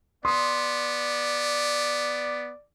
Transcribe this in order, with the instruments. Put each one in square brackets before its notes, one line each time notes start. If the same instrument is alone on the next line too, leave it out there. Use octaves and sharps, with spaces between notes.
[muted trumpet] B3 [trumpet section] D5 [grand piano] C6 D#6